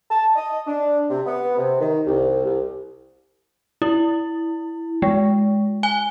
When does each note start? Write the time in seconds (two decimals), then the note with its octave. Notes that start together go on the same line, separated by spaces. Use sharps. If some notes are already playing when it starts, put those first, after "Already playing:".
0.11 A5
0.36 D#5
0.67 D4
1.10 C3
1.27 B3
1.57 C3
1.81 D#3
2.06 C2
2.45 C2
3.82 E4
5.02 G#3
5.83 G#5